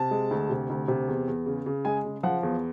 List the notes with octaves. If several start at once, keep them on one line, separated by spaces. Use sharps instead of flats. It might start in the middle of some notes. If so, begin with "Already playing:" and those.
Already playing: C3 A5
G#3
D2
C3
D2
C3
E2
E2
C#3
C#3
G#3 G#5
C#3
F3 F#5
E2